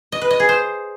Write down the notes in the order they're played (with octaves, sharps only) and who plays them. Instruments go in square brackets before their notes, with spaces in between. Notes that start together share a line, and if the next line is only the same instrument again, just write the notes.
[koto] D#5
B4
D#5
G#4
C5